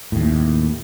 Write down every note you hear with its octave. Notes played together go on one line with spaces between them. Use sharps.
D#2 A2